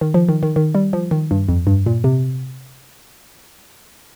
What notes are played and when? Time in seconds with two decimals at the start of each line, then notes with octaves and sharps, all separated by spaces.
0.01 D#3
0.14 F3
0.29 D#3
0.43 D#3
0.56 D#3
0.75 G3
0.93 F3
1.11 D#3
1.31 G2
1.48 F2
1.67 G2
1.86 A#2
2.04 C3